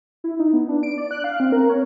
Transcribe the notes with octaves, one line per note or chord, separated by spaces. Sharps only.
E4
D#4
B3
D4
D7
D5
F#6
F5
C4
A#4
C#5